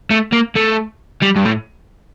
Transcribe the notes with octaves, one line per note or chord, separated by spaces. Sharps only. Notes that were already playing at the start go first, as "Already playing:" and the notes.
A3
A#3
A3
G3
G2
A2